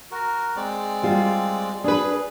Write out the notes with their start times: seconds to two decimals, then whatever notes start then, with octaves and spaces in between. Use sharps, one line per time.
0.11 F#4 A#4
0.56 G#3 C4 D5
1.03 G3 F4
1.84 D4 G#4 B4